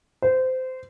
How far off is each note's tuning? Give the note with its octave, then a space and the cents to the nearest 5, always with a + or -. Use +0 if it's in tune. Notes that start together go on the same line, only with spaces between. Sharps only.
C5 -20